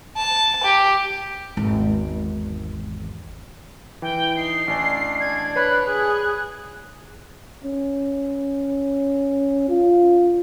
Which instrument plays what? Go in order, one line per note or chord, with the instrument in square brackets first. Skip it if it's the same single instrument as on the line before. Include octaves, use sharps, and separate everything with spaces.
[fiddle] A5
G4
[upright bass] G#1 E2
[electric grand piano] E3 [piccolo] G5
[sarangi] D#4 [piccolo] C7
[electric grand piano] A1 G#5 [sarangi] D4
[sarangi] D4 [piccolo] G#6
[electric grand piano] B4 C#5 B5 [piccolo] F#6
[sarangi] G#4 [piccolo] F#6
[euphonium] C#4
F4